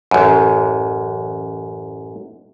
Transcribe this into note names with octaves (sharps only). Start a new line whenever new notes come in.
A1 F#2